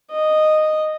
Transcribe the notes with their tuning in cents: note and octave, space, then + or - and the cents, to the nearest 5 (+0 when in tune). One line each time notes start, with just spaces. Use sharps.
D#5 -10